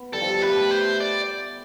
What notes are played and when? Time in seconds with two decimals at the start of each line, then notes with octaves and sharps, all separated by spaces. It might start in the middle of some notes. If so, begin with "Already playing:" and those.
Already playing: B3
0.13 G3 A4
0.21 F3
0.30 G3
0.42 A3 B4
0.71 C5
1.00 D5